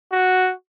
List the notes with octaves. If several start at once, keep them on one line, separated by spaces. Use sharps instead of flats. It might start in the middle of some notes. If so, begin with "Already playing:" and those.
F#4